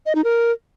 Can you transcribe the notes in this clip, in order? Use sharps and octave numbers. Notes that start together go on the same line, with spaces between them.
D#5
D#4
A#4